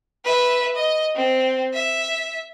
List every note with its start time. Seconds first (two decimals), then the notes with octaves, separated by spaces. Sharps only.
0.25 B4 E5
0.75 D#5
1.15 C4
1.74 E5